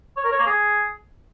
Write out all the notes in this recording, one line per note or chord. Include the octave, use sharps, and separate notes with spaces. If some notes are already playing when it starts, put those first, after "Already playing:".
C#5
A#4
C#5
A#3
G#4